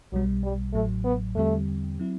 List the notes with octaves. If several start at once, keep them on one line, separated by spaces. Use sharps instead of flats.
B1 B2 F#3 G3
G3
A1 A2 F#3 A3
B3
E2 D3 G3 A3 C4 G4
F#3 C4 E4